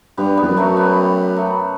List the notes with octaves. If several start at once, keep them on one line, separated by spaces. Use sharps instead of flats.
G2 G3 B3
E2 G3 B3
F#2
F#3 A3
G3 B3
F#3 A3